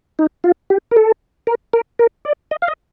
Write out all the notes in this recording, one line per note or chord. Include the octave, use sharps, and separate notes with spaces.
D#4
F4
G4
A#4
A4
A#4
A#4
A#4
D5
D#5
F5
D#5